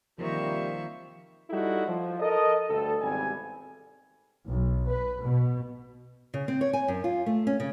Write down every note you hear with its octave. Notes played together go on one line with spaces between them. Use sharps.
C3 D#3 F3 G3 A#3 C5 E5 C#6
G3 D#4 E4 F#4 A4
F3
A4 A#4 D#5
D2 G2 A4
G#1 E2 C3 G3 G#5
B1
B4
B2
C#3
C4
C#5
G#5
F#2
F4
A3
C#4
C#3